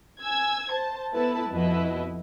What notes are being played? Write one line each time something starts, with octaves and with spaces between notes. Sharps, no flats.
G#5 E6 G#6
C5 A5
B3 E4 A4 B4 A5
F2 B2 E4 B4 D#5